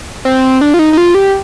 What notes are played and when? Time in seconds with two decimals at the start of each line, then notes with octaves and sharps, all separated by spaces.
0.25 C4
0.61 D4
0.74 F4
0.79 D#4
0.93 D#4
0.97 F4
1.15 G4